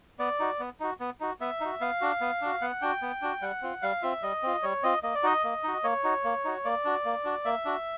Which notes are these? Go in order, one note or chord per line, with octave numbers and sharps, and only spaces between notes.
B3 D5
D#4 F#4
B3
D#4 F#4
B3
D#4 F#4
B3 E5
D#4 F#4
B3 F5
D4 F#4
B3
D4 F#4
B3 F#5
D4 F#4 G5
B3
D4 F#4
G3 F#5
C4 F4
G3 F5
C4 F4 E5
G3 D#5
C4 F4
G3 C#5
C4 F4 D#5
A#3 D#5
D5
D#4 F#4 D#5
A#3
D#4 F#4
A#3 C#5
D#4 F#4
A#3
D#4 F#4
A#3 D5
D4 F#4
A#3
D4 F#4
A#3 E5
D4 F#4